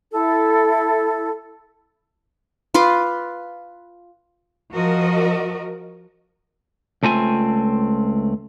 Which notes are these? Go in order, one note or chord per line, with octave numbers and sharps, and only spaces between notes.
E4 A4
F4 B4 C6 D6
F3 F#4 A#4 D#5
C#2 A3 C4 F4 G#5